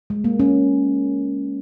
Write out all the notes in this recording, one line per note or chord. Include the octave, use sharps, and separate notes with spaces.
G#3
A#3
C#4